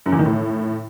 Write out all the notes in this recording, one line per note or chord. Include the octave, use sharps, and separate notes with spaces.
F#2
E2
D#3
A2